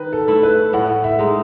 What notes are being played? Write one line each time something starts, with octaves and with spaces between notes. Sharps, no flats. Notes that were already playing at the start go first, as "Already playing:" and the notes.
Already playing: D#3 B4
A4
A3 E4
B4
A2 F#5
E5
G#3 D#4